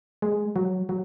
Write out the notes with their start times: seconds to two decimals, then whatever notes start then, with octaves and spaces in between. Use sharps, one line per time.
0.22 G#3
0.56 F#3
0.89 F#3